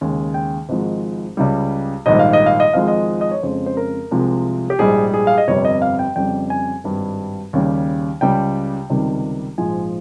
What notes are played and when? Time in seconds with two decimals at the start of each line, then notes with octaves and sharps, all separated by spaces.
0.01 D#2 C#3 G#3
0.34 G5
0.69 G#1 G#2 F3 G#3
1.37 C#2 C#3 G3
2.06 A#1 G#2 D#3 G3 D#5
2.19 F5
2.33 D#5
2.46 F5
2.60 D#5
2.73 G#1 G#2 F3 G#3 F5
2.88 D#5
3.21 D#5
3.32 C#5
3.43 F2 C#3 G#3 C5
3.66 C5
3.77 A#4
4.11 C2 C3 F3 G#3
4.70 G4
4.79 A#1 G#2 G3 G#4
5.14 G#4
5.27 F5
5.38 D#5
5.48 G1 F2 C3 G3 C#5
5.65 D#5
5.82 F5
5.99 G5
6.16 F2 C#3 G3 G5
6.50 G#5
6.84 G#1 G2 G3
7.53 D#2 C#3 G3
8.21 C#2 C#3 G3 G5
8.90 C#2 C3 D#3 G3
9.58 A#1 G#2 F3 G#3 G#5